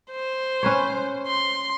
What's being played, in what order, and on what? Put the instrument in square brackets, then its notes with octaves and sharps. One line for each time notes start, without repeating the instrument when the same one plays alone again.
[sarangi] C5
[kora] C#4 B4 C#5
[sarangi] C6